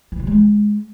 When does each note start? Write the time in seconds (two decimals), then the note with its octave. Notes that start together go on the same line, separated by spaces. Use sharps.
0.12 E3
0.19 C3
0.27 G#3